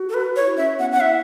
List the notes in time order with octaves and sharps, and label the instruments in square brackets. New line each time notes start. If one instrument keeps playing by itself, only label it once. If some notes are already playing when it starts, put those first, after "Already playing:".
Already playing: [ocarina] F#4
[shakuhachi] A4
B4
[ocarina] F#4 [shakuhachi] C#5
[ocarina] E4
[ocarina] C#4 [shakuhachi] E5
[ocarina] B3 [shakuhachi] F#5
[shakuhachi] F#5
[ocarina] E4 [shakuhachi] E5